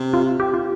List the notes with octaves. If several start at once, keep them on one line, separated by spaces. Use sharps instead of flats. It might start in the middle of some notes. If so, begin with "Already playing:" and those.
Already playing: C3
F4
G4
F4